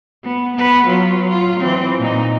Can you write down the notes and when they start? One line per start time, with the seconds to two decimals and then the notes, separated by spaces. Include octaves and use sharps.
0.24 B3
0.56 B3 B4
0.86 F#3 F4
1.29 F4
1.60 E3 C4
1.99 A#2 D#4